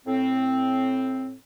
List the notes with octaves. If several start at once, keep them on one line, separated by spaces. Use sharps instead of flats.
A2 C4